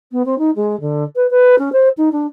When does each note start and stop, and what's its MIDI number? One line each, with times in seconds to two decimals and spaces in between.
0.11 0.22 59
0.25 0.38 60
0.38 0.50 63
0.55 0.79 56
0.80 1.03 50
1.15 1.27 71
1.30 1.55 71
1.58 1.72 61
1.72 1.88 72
1.97 2.09 63
2.12 2.26 62